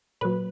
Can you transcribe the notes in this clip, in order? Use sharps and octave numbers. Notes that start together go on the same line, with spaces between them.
A#2 F#3 B4